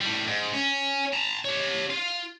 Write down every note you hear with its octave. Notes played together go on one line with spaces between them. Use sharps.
A2 G3
G#2
C#4
A5 A#5
G4 C#5
F4